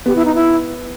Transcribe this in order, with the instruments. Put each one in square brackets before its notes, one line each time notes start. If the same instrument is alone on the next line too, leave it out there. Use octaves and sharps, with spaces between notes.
[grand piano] B3 [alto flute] G4
[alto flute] E4
D#4
E4